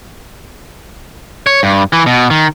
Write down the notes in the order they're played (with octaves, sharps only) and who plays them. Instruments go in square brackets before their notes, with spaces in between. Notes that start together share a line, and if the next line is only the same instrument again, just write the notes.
[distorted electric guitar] C#5
G2
E3
B2
D#3